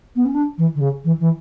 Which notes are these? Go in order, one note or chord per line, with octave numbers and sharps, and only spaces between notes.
B3
C#4
D4
E3
D3
C#3
E3
E3